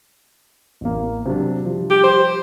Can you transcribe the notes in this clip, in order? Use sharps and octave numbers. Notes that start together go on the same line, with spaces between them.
A1 A#3
C3 F#3 D4
F3 G3
G4
C5